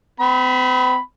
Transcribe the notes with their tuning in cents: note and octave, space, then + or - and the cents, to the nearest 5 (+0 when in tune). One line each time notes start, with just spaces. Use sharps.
C4 -45 B5 +0